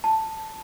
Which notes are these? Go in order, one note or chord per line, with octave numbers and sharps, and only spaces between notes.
A5